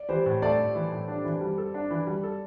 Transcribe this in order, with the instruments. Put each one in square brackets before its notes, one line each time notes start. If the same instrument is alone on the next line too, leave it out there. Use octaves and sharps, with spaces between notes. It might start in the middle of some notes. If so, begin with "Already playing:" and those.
Already playing: [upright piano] D5
[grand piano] E3 [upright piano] G4 C5
[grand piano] A2
[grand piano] A3 [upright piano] A4 D5
[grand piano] A2
E3
A2
D4
E3
G3
A4
D4
E3
G3
A4